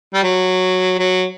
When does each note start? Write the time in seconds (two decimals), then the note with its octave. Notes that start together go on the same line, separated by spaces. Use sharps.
0.14 G3
0.23 F#3
0.98 F#3